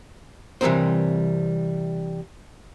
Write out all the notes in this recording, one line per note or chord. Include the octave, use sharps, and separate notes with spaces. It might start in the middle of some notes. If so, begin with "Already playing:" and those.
C3 E3 G3 C4 A#4 C5